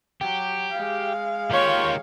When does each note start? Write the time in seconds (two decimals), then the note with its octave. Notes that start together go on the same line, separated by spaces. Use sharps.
0.21 F#3 G4
0.71 G#3 F5
1.51 D#3 F4 G4 C#5